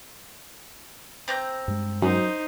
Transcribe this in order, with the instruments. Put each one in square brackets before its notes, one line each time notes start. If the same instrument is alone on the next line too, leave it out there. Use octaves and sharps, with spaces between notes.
[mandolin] C4 A#5 G6
[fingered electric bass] G2 G#3
[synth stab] F#2 [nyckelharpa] D#4 C5